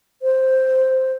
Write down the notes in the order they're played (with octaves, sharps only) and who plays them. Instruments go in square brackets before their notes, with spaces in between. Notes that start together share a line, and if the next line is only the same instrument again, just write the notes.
[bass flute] C5